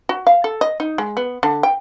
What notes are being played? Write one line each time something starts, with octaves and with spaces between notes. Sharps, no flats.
F#4
F5
A4
D#5
D#4
G#3
B3
D3
G5